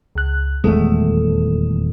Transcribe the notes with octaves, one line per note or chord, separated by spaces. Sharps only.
C#2 F#6
D#1 E2 G#3 A3 A4